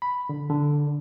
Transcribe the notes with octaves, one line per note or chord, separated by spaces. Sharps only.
B5
D3
D3